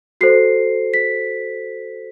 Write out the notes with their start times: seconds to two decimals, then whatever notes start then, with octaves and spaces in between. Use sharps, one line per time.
0.21 F#4 A4 C5 C7
0.94 B6